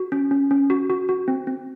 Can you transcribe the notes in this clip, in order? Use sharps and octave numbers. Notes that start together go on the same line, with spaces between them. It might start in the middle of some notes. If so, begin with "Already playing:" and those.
Already playing: F#4
C#4
C#4
C#4
F#4
F#4
F#4
C4
C4